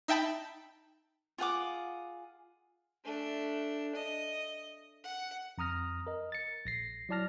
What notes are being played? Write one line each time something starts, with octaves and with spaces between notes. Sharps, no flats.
D#4 E5 G5 A5 B5
F4 G#4 F#5 D6
A3 D4
D#5
F#5
F2 A#5 D#6 F6 A#6
A#4 D#5
A6 C#7
A#1 A#6 C7
F#3 E4 D5 A5 F6 A#6